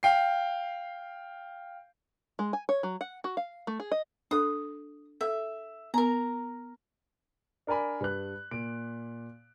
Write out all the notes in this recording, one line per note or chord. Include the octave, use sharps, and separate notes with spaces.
F5 G5 C7
G#3
G#5
C#5
F#3
F#5
F#4
F5
A3
G#4
D#5
D4 A4 D#6
A4 E5
B3 A#4 A#5
D4 A#4 D5 G#5 B5
G2 B4 F#6
A#2 D7